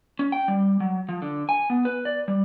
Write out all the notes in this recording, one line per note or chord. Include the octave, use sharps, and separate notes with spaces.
C#4
G5
G3
F#3
F3
D3
G#5
B3
B4
D5
G3